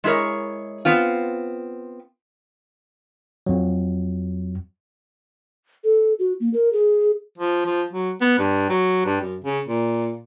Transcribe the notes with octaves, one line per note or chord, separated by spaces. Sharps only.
G#3 E4 G#4 A#4 C#5
B3 C4 F4
F2 F#3
A4
F#4
A#3
A#4
G#4
F3
F3
F#3
B3
G2
F#3
G2
F#2
C#3
A#2